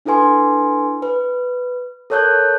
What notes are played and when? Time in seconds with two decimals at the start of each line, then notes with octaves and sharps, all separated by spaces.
0.05 D4 E4 A4 B4 G#5 C6
1.02 B4
2.10 A4 A#4 C#5 A5 F#6 G6